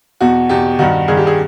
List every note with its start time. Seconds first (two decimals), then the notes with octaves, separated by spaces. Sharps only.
0.21 E2 B2 F#4
0.49 E2 B2 G4
0.79 G2 D#3 F#4
1.08 G2 D#3 G#4
1.17 G4
1.27 G#4